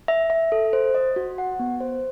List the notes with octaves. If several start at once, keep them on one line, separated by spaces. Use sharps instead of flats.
E5
E5
A4
C5
D#5
F#4
F#5
B3
C5